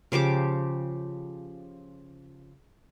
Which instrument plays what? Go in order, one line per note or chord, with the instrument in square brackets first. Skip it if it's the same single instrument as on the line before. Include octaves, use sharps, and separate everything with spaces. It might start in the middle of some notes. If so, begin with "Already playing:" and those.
[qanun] C#3 F3 G4 D6